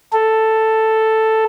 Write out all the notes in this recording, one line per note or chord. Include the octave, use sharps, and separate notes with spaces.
A4